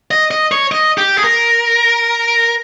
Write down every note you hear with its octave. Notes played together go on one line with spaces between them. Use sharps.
D#5
D#5
C#5
D#5
G4
G#4
A#4